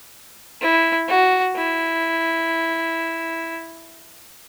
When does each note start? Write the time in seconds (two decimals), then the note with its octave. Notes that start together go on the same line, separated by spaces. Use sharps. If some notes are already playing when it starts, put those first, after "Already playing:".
0.61 E4
1.09 F#4
1.56 E4